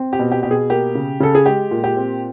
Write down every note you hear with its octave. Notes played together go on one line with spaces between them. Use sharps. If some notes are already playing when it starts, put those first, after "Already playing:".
Already playing: C4
G4
B2
G4
B2 G4
G#4
A#3 G4
C#3
C#3 A4
G#4
G#3 G4
A#2
G4
C4